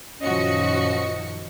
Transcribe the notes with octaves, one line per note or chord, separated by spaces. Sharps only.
F#2 A#2 D#3 F3 C#4 F#4 D#5 C#7